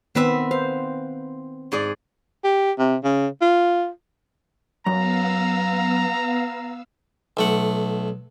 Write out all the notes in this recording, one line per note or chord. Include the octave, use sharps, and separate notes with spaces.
D#3 B3 C4 B4 E5
C5 F5
G#2 G#4 D5
G4
C3
C#3
F4
F#2 B3 F5 A#5 E6
B1 A3 F#5